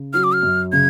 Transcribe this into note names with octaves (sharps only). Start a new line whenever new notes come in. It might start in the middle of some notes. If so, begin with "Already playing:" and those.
Already playing: C#3
F#3 F6
D6
F6
F#2
C#3 G#6